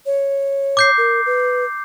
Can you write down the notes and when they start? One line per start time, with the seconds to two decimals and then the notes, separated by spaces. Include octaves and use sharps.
0.06 C#5
0.77 D6 G6 C7
0.98 A#4
1.26 B4